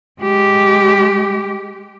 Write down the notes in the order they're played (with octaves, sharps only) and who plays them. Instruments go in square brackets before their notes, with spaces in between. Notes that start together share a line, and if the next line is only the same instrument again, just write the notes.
[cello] G#3 G4